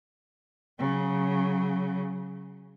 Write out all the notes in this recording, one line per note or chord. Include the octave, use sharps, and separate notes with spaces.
C#3 F#3